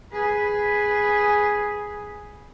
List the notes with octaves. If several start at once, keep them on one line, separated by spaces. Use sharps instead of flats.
G#4 B4